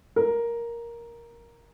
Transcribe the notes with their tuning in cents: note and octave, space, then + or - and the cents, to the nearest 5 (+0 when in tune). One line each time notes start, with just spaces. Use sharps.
A#4 +5